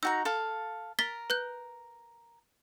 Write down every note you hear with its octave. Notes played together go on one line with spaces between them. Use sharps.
D#4 F#4 A#5 E6
A4 F5
A#4 A6 B6 G7
B4 F#6 G6